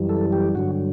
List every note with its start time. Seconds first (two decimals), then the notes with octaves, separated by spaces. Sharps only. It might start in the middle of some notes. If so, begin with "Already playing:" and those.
Already playing: F#2 E3 G3
0.09 A4
0.32 G4
0.55 G2 D3 F#3 F#4